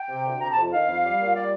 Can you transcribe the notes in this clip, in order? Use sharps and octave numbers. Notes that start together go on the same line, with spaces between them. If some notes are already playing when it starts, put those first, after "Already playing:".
Already playing: G5
C3
D2
C3 A#5
A5
F2
D#3 F5
F2
G3
A#2
G3 D5